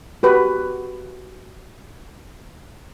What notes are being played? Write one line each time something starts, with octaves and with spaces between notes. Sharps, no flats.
F#4 G4 B4